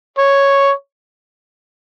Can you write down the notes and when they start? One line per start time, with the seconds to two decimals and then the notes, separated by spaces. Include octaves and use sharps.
0.18 C#5